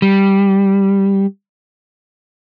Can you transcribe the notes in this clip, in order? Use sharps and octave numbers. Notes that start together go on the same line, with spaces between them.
G3